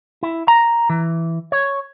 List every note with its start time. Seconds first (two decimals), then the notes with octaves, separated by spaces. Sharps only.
0.23 E4
0.48 A#5
0.90 E3
1.52 C#5